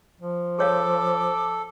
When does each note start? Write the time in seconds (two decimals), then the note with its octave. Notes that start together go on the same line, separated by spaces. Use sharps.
0.21 F3
0.59 G#4 A4 C#5 F5 D6